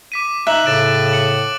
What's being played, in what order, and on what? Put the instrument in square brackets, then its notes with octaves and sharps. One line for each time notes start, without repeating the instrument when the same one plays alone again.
[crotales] D6 B6 D#7
[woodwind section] D#4 [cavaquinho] E5 [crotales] F#6 E7 F#7
[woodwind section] A2 C#3 [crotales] D6 A6 D7
[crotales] C#7 F#7